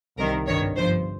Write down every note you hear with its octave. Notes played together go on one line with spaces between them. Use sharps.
C2 C3 D#3 A#4
G#1 G2 D#3 C#5
G1 G2 F3 C5